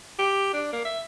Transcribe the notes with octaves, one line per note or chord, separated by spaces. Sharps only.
G4
D4
A#3
E5